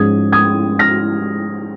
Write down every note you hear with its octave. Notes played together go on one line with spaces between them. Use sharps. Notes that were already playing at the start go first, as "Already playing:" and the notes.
Already playing: G#2 F3 G#3 C#4 D#6 G#6
D#6 G#6
F6 A#6